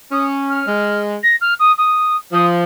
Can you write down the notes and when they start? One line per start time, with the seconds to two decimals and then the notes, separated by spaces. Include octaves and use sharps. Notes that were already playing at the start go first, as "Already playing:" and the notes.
0.12 C#4 D#6
0.49 F6
0.68 G#3
1.23 A#6
1.41 F6
1.59 D#6
1.78 D#6
2.33 F3 D#6